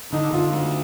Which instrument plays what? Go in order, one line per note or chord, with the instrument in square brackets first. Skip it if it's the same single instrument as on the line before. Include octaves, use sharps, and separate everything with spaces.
[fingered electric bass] D3 [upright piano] D#4
[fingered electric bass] D3 [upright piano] F4
[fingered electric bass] A3